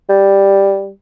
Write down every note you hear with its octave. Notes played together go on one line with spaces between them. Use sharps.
G3